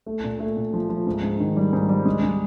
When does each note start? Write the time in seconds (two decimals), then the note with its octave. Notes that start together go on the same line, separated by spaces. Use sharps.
0.06 A3
0.24 A#2
0.40 A3
0.57 A#2
0.73 F3
0.89 F3
1.07 G#2
1.23 G#2
1.40 D#3
1.57 G3
1.73 G#2
1.89 G3
2.06 G#3
2.23 G#3